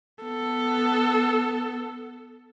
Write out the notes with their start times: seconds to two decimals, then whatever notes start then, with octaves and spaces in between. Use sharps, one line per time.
0.24 B3 A4